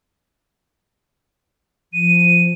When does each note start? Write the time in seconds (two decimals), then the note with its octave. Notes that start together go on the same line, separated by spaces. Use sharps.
1.93 F3 D#7